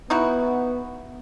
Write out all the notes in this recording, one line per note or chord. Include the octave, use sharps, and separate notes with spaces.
B3 D#4 E4 F#4